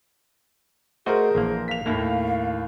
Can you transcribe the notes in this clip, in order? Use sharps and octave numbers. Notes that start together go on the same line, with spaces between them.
A3 F#4 G#4 A#4 C5 D#5
A#1 E3 A#3
F5 B6 F7
D#2 A2 A#3 E4